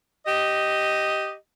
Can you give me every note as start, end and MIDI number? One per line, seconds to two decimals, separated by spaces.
0.25 1.33 67
0.25 1.33 75